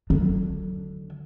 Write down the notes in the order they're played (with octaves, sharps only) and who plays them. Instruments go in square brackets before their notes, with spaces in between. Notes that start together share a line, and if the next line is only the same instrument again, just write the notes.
[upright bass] D3 F#3